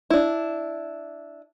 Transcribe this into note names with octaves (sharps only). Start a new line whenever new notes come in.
D4 E4